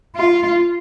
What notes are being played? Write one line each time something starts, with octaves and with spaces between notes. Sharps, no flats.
F4